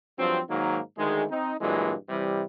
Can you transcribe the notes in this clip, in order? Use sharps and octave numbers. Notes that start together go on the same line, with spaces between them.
G2 F3 F#3 C4
G#2 D#3 F#3 A#3 A#4
D2 D#3 G#3
C4 D#4
G2 A#2 E3 F#3 G#3
C3 E3 G3